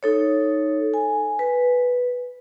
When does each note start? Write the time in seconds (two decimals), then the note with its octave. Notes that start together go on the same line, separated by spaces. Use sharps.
0.03 D#4 A4 C#5
0.94 G#5
1.39 B4